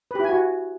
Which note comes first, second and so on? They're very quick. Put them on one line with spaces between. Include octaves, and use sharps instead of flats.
B4 G4 E4 G#5 F#4